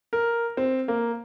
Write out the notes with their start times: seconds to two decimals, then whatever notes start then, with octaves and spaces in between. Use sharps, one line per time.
0.13 A#4
0.57 C4
0.88 A#3